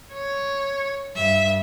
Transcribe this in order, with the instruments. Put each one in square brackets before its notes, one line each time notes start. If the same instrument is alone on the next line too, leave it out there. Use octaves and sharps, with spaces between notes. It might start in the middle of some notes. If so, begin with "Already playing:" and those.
[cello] C#5
[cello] G2 [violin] E5